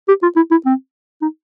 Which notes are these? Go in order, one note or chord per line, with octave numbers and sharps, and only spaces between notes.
G4
F4
E4
E4
C4
D#4